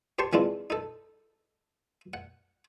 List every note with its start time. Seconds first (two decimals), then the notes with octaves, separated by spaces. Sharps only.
0.19 G4 C5 A5 C6 C#6
0.33 E3 G#3 C4 D4 E4 F4
0.70 D#4 A4
2.14 F#5